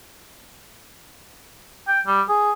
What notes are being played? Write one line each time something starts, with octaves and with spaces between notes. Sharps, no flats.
G5
G3
G#4